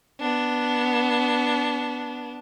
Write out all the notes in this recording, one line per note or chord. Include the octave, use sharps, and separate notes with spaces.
B3 D4